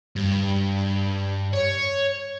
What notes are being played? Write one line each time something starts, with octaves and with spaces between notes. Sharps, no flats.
G2
C#5